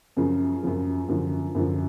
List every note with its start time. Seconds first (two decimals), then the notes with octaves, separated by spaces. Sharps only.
0.17 F#2 C#3 F3
0.63 F#2 C#3 F3
1.08 F#2 D3 F3
1.55 F#2 D3 F3